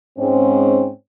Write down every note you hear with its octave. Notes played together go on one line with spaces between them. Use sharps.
G#2 C4 C#4